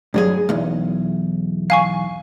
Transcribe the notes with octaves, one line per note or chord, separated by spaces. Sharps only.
G2 F#3 G#4
B1 E2
F5 G#5 C#6